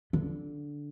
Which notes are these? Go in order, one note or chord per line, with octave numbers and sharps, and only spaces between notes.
D3